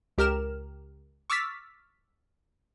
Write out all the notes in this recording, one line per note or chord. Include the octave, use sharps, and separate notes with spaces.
C#2 G4 A#4 F6 E7
C#6 D6 E6 F6 A6 B6